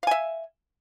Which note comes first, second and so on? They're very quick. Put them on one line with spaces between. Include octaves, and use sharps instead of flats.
F5 G#5 E5